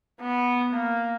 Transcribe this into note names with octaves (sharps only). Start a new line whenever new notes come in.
B3
A#3